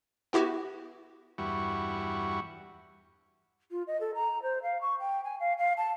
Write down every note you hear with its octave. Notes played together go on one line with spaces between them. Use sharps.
B3 E4 F#4 G4
E2 G2 G3 E4 F#4 C#6
F4
D#5
A4
A#5
C5
F5
C#6
G5
G#5
F5
F5
A5